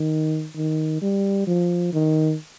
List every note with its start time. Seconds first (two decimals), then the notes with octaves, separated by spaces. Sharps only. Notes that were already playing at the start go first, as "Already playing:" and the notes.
Already playing: D#3
0.56 D#3
1.02 G3
1.47 F3
1.93 D#3